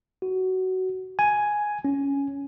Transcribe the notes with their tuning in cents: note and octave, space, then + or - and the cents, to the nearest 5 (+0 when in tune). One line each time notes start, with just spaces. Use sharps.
F#4 +15
G#5 +5
C#4 +10